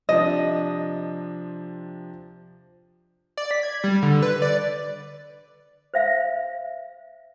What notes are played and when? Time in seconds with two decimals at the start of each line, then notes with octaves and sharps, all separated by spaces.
0.09 C3 F3 D4 D#5
3.37 D5
3.51 B6
3.63 G#6
3.84 G3
4.02 D3
4.22 B4
4.42 D5
5.94 C5 E5 F5